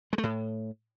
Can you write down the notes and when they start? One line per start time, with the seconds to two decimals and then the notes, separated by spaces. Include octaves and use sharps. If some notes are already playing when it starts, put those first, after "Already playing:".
0.13 G#3
0.18 A3
0.23 A2